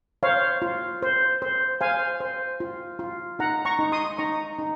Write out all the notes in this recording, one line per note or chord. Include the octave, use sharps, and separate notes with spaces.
C5 C#5 F5
F4
C5
C5
C5 F5 G#5
C5
F4
F4
D#4 F#5 A#5
A#5 C#6
D#4
C6 D#6
D#4 A#5 C#6
D#4